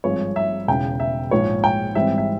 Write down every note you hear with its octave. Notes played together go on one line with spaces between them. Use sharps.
G#1 G2 F3 G#3 C4 C#5
E5
E1 E2 C#3 G5
E5
A#1 G#2 F3 C#5
G5
G#1 G#2 E3 G3 C4 E5
E5